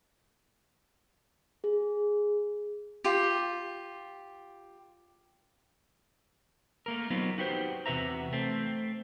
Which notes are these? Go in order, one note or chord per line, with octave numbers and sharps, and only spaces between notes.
G#4
F4 G4
A3 A#3 A#4
F#3 B3 C4 D#4 F4
D#4 F#4 G4 B4 C5
E2 C3 F#4 B4 E5 A#5
A3 C4